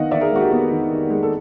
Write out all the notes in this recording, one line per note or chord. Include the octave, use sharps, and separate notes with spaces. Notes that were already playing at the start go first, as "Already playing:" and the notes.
Already playing: D#3 B3 D#5 F5 F#5
D#3 D5 E5
G#4 A#4
G#3 F#4
G4
B3 F#4
D#3
D#3
G#3
A4